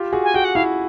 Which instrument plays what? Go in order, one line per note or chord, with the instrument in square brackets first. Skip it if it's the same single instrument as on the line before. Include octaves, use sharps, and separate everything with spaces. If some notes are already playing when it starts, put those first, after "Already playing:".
Already playing: [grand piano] F4 G4
F#4 G#4
[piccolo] G#5
[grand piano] F#4 G#4 [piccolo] G5
[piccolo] F#5
[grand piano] E4 F#4 [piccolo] F5